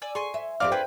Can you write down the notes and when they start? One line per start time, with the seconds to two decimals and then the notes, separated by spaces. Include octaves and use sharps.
0.02 D5 G#5 E6
0.15 G#4 G#5 C6 C#6
0.34 E5
0.60 F2 C4 G4 D5 F5 D6 F6
0.72 D4 F4 G#4 B4 G5